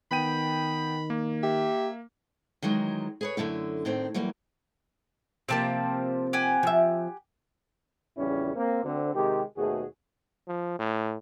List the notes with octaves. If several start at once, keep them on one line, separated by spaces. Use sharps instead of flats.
D#3 B3 G5 B5 D#7
A#3
G4 E5
D#3 E3 F#3 G#3
G#4 B4 C#5
F#2 D3 D#3 A3 E4
A2 D#3 C4 D4
E3 F#3 G3 A#3
C3 F3 A#3 C4 G4 A5
G4 F#5 G#5
F3 E5
A#1 E2 C#3 G3 C#4 E4
A#3 C4
D2 D3 C4
C3 D#3 G#3 G4
D#2 B2 A3 F#4 G#4
F3
A2